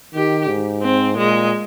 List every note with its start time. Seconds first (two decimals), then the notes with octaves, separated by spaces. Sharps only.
0.14 D#3 G4
0.48 G#2
0.82 C4
1.17 A#2 G#3